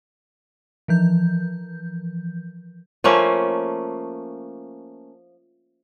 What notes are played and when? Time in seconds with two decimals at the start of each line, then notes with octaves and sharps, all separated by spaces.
0.88 E3 F3 G6
3.04 F3 A3 A#3 C#4